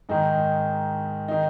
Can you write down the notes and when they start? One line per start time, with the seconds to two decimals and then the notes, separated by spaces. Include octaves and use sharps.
0.09 G#2 D#3 D#4
1.28 D#3 D#4